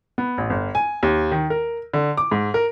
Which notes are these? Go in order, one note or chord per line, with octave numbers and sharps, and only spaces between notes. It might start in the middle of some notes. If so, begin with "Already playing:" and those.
B3
A1
G1
G#5
D#2
D#3
A#4
D3
D6
G#2
A#4